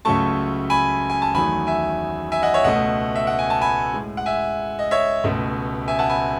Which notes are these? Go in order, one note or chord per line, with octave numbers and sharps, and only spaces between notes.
C#2 C#3 F#3 A3 A5 C#6
G#5 B5
G#5
A5
E2 D#3 F#3 A3 G#5 B5
E5 G#5
E5 G#5
D#5 F#5
C#5 E5
C#2 B2 A3 D#5 F#5
E5
F#5
G#5
A5
G#5 B5
A2 G#3
F#5
E5 G#5
D#5
C#5 E5
C#2 B2 A3
E5 G#5
F#5 A5
G#5 B5